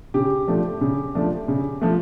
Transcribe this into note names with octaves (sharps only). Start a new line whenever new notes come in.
C#3 G4
F3 A3 D4
C#3
F3 A3 D4
C#3
F3 A3